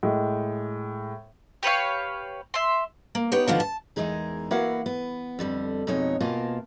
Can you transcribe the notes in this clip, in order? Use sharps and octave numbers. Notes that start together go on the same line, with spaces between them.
A2 G#3
G4 B4 C#5 F5
E5 C6
A#3
B3 D#4 G4 B4 C#5
D3 D#3 F3 B3 F4 F#4
A5
E2 E3 G#3 D#4 G#4 A#4
A#3 E4 F#4 B4 F5 F#5
B3
F2 D3 G3
F2 B2 G#3 D#4 C#5
B2 A#3 F4 A#4 G#5 A5